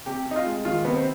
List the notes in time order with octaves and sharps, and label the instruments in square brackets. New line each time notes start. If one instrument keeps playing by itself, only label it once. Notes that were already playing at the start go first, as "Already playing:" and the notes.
[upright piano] C3 [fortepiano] G4
[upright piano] C3
[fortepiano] D#4
F4
[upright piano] G#3
[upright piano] D#3 [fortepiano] F4
[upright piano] C3 [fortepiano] B3
[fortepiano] C4